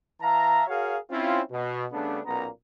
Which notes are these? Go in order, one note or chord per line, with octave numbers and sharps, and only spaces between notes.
E3 E5 F5 A5 A#5
F#4 G#4 A#4 C#5 F5
C4 C#4 E4 F4
B2
C#3 G3 A3 B3 D4
B1 A#2 A#3 B3 C#4 A#5